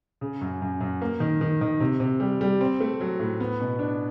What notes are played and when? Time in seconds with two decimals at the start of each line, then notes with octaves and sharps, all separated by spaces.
0.21 C#3
0.41 F#2
0.62 F#2
0.81 F#2
1.02 A#3
1.20 D#3
1.41 D#3
1.61 D#3
1.80 C3
2.00 C3
2.20 G3
2.41 G3
2.61 C4
2.80 A3
3.00 F#3
3.19 A2
3.40 B3
3.60 B2
3.79 D4